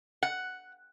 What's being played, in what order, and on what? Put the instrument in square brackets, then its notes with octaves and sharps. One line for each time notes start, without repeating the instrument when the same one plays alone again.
[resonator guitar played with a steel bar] F#5